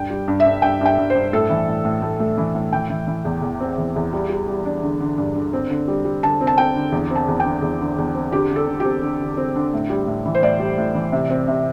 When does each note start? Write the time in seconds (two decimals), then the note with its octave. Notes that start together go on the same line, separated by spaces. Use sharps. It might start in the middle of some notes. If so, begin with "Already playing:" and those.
Already playing: G2 G5
0.10 G3
0.28 G2
0.40 E5
0.46 G2
0.62 G2 G5
0.81 G2 G5
0.97 G2
1.10 C5
1.15 G2
1.33 A2 A4
1.50 E3
1.68 A2
1.85 A2
2.02 A3
2.20 A3
2.38 E3
2.55 A2
2.73 E3 G5
2.90 E3
3.07 E3
3.25 E2
3.42 E2
3.60 C4
3.78 E2
3.96 E2
4.13 G3
4.30 G3
4.48 G3
4.65 D4
4.83 D3
5.00 D3
5.18 G2
5.35 D3
5.53 C4
5.70 D3
5.88 G3
6.05 G3
6.23 D3 A5
6.41 C4
6.47 A5
6.57 C4 G5
6.75 D3
6.92 E2
7.10 C4
7.16 A5
7.28 E2
7.40 D3 G5
7.62 E2
7.80 D3
7.98 E2
8.15 C4
8.32 D3 G4
8.50 D3
8.56 A4
8.68 D3
8.80 C4 G4
9.02 D3
9.21 D3
9.37 C4
9.56 D3
9.73 A2
9.90 G3
10.07 A2
10.25 E3
10.34 C5
10.42 A2 D5
10.60 G3
10.78 A2
10.95 E3
11.12 C3
11.30 C4
11.48 C3